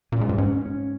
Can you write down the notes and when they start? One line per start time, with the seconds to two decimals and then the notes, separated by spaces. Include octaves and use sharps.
0.12 A#2 C#4
0.21 G#2
0.29 G2
0.38 G#2 C#4
0.66 C#4